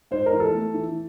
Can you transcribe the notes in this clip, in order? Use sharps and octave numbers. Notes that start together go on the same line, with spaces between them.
G#2 C5
A#4
E3
A4
A3
E3